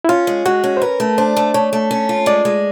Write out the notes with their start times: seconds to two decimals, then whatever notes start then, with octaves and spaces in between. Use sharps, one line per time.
0.04 E4
0.09 C#4 F4
0.27 G#3
0.45 G#3 F#4
0.64 C#4
0.77 C5
0.82 A#4 B4
1.00 A3
1.18 D4 C5
1.36 A3
1.54 A3 C#5
1.73 A3
1.91 C#4
2.09 F4
2.26 G#3 D5
2.45 G#3